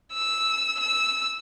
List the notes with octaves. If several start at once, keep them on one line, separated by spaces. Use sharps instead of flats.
E6
E6